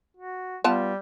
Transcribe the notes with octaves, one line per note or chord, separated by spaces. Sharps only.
F#4
G3 B3 F4 A5